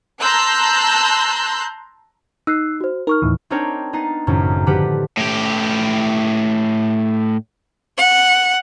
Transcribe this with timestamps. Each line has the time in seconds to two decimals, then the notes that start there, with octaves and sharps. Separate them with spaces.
0.21 A5 A#5 C6 E6 F#6 G6
2.47 D#4 E6 F#6 C7
2.81 F#4 C5
3.07 D#4 A#4 C#6 F6
3.22 D#2 A2 E3
3.50 C4 D4 D#4 A#4 C#5 G5
3.93 B3 D#4 A6 C7
4.27 G#1 F#2 A2 C#3
4.66 D3 F3 G4 B4 F#5
5.17 A2 G4
7.97 F#5